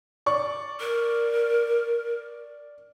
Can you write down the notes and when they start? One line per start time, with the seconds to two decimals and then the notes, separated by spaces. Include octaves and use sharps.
0.26 D5 C#6
0.80 A#4